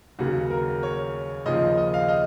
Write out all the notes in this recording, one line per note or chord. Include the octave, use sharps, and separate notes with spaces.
D#2 C#3 F#3 F#4
A#4
C#5
D#2 C#3 F3 D#5
D#5
F5
D#5